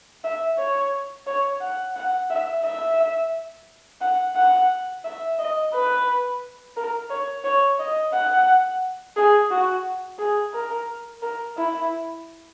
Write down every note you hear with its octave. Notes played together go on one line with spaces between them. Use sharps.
E5
C#5
C#5
F#5
F#5
E5
E5
F#5
F#5
E5
D#5
B4
A#4
C#5
C#5
D#5
F#5
G#4
F#4
G#4
A#4
A#4
E4